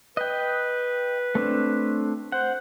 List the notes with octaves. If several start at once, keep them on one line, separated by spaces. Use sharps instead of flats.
B4 D#5 G5
A3 C4 D4
C5 F#5